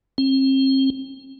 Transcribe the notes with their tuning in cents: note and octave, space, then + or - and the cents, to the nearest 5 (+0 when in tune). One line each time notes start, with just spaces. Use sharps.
C4 +40